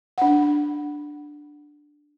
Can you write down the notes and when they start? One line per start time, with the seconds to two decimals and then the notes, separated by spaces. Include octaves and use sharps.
0.18 D4 F#5